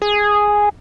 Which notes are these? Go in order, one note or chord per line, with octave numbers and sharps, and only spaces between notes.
G#4